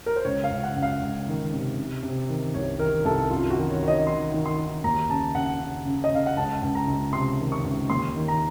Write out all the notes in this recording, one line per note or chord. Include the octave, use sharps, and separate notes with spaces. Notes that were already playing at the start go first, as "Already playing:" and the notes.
A#4
C5
C#2 C#5
F5
C#2
F#5
C#2
F5
C#2
D#3
C3
C3
C3
D#3
C2 C#5
D#3 A#4
C2 A4
F#2 F4
F#4
D#3
C#5
D#3 C#5
D#5
D#3 C6
D#3
C6
D#3
D#2 A#5
C#3 A5
C#3 F#5
C#3
C#3
D#5
C#3 F5
F#5
C#2 A5
C#2
A#5
C#2
C3 C6
D#3
C#6
C#2
D#2 C6
D#3
A#5